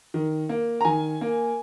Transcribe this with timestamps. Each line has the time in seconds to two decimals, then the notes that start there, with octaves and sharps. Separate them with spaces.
0.14 D#3
0.49 A#3
0.81 A#5
0.85 D#3 G#5
1.21 A#3